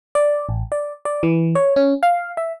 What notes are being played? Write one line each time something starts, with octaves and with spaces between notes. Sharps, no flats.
D5
A1
D5
D5
E3
C#5
C#4
F5
E5